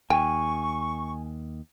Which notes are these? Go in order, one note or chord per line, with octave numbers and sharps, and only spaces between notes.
D#2 G5 G#5 C#6